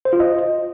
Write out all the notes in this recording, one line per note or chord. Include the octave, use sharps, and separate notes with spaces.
C5
F4
D#5